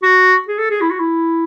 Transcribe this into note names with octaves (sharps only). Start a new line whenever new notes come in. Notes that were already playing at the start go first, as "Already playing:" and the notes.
F#4
G#4
A4
G#4
E4
F#4
E4